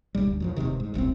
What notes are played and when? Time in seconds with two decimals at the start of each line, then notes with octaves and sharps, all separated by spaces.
0.15 E1 A#1 G#2 G3
0.26 D2
0.40 F#2 D3 F3
0.56 E1 B1 C3 D#3
0.80 G#2
0.94 D#1 C2 B3 C4